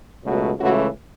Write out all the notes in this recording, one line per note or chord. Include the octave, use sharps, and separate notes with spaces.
C#2 B2 F#3 A3 F#4
C#2 C#3 E3 A3 C#4 F#4